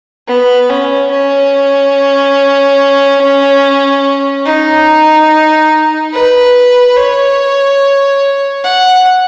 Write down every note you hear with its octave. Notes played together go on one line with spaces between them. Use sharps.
B3
C#4
C#4
D#4
B4
C#5
F#5